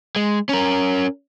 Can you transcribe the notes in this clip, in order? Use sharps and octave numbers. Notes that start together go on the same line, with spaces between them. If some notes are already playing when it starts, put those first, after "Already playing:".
G#3
C#4 A#4